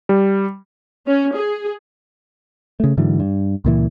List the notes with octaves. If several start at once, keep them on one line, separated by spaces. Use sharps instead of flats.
G3
C#4
G#4
C#3 A3
G#2 D3 E3 F#3
G2
C#2 A#2 E3